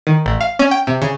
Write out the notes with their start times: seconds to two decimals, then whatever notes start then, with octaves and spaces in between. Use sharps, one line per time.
0.07 D#3
0.26 A1
0.41 F5
0.59 C#4
0.71 G5
0.87 C3
1.02 C#3